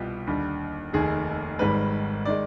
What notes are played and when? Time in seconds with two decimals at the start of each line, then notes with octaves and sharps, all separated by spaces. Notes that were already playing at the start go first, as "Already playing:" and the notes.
Already playing: C2 B2 G3 F4 G4
0.27 D#2 D3 G3
0.93 F1 D#2 D#3 G#4
1.59 G#1 G#2 D#3 G3 B4
2.26 D#3 G#3 D5